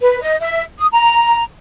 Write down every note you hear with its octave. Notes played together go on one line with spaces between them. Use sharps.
B4
D#5
E5
D#6
A#5